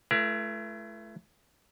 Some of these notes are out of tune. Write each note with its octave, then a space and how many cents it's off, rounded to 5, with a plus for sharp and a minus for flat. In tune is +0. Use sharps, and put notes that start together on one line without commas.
A3 -25 E4 +35 B4 -45